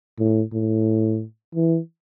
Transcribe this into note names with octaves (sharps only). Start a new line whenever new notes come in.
A2
A2
E3